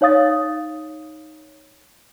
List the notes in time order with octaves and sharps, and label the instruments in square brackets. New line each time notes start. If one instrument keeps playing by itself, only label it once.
[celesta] D#4 C#5 F5 D#6 A6